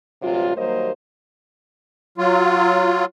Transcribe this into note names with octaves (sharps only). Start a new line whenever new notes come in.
D2 G2 C3 F#3 F4
D#2 F#3 G3 A#3 C5 D#5
F#3 F4